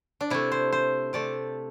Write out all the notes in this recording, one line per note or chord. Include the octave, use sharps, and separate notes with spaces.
D4
C3 A3 E4
C5
C5
C3 A3 D5